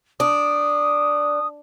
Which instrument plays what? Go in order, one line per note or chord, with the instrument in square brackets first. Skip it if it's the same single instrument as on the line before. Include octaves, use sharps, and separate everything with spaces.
[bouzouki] D4 [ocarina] D#6